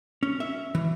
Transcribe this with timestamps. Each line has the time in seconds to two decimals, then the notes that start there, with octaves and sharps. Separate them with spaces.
0.23 C#4
0.40 E5
0.75 E3